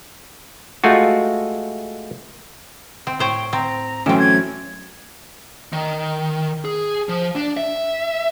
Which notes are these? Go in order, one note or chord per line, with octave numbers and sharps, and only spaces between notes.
G#3 A3 F4 F#4
C4
A2 C5 C#5 G5
C4 A#5
E3 F#3 A3 C4 C#4 G5
G#6
D#3
G#4
F3
D4
E5